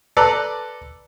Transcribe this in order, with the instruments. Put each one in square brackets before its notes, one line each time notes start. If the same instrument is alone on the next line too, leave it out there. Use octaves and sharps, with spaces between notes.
[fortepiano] A4 B4 D5 A#5